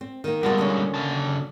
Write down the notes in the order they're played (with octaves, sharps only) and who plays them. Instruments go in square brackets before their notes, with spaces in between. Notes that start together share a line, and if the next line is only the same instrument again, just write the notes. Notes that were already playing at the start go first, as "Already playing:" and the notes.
[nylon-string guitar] C4
D#3 A#3
[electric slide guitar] G3 G#3 F4 [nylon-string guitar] B3 D5 A5
[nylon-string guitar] D#2 D3 C#4
[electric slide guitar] C#3 F#3 A5